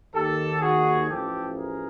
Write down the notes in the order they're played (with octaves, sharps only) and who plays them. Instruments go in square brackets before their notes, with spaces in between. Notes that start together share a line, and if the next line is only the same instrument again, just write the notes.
[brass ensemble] D#2 D#3 G4 A4
F#4 G#4
A1 A2 F3 G4 A4
G#4 A#4